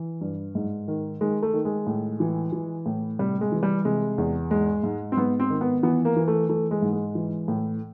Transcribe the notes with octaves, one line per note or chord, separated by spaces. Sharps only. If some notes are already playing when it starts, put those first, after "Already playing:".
Already playing: E3
G2
G#2
D#3
D#3 G#3
A3
D#3
G#3
A2
E3
E3
A2
C3 G3
G#3
E3
G3
C3 G#3
E2
G#2 G#3
G#2
C4
G#2 B3
C4
D#3
B3
E3 B3
A#3
E3
A3
E3 A3
G#3
G#2
G#3
E3
A2